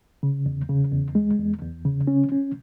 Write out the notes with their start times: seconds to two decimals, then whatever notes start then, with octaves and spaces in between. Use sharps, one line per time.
0.23 C#3
0.46 E2
0.69 C#3
0.92 E2
1.15 G#3
1.39 E2
1.62 E2
1.85 C#3
2.07 C#4
2.32 C#4